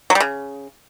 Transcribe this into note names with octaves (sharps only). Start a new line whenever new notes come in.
F#3
G3
C#3